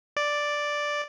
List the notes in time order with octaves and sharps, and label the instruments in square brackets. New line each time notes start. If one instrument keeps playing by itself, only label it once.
[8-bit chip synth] D5